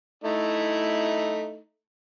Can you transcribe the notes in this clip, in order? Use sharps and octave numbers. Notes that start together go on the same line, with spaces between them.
A3 D#4 E4